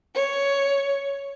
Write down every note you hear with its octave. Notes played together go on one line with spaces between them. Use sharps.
C#5